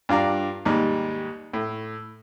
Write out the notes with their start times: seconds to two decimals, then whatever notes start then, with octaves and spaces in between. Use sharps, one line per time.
0.09 G2 F4 D5 A#5
0.66 D#2 G#2 G3
1.53 A2